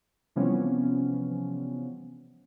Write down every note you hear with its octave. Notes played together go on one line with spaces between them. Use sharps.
C3 E3 F3 G3 B3 C#4